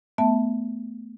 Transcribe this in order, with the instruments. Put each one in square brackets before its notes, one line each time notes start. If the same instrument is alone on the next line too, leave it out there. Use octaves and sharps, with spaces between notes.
[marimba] A3 B3 E5 A5